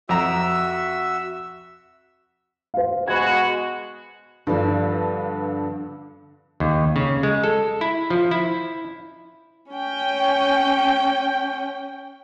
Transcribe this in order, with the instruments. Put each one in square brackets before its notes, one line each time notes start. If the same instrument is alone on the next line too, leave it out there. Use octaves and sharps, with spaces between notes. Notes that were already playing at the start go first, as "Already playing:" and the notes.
[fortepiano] F2 A#5 [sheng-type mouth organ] F#4 E5 E6
[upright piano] C5 F5
[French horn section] B2 G#3 F#4 [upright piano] B5 G#6
[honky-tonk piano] G2 F3 [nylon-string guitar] D3 B3 D4
[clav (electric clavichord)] D#2
C#3
G#3
A4
E4
F3
E4
[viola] C#4 G5